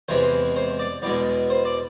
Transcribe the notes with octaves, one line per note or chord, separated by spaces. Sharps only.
E2 C3 E3 G#3 C5
C5
D5
E2 B2 G#3 D5
C5
D5